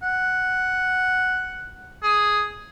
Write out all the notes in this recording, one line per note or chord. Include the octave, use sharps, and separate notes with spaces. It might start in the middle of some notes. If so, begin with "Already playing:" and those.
F#5
G#4